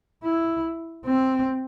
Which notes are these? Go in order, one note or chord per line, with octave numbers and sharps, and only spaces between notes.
E4
C4